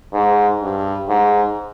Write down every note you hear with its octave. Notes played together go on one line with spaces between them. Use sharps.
G#2
G2
G#2